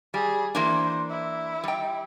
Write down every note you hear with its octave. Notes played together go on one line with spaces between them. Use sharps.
G3 G#4
E3 A#3 D4 C5
E4
G3 G5